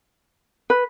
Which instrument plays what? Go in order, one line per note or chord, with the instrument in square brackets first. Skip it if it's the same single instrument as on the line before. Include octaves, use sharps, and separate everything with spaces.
[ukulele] B4